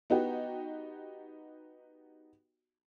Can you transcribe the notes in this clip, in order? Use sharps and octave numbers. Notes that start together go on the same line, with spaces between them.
B3 D#4 F#4 G4